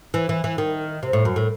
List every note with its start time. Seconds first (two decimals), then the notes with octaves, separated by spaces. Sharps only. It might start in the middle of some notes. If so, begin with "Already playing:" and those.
0.14 E3
0.29 E3
0.44 E3
0.58 D#3
1.03 C3
1.13 A2
1.25 F#2
1.36 A2